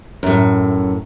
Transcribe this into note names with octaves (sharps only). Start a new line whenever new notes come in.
F#2 A2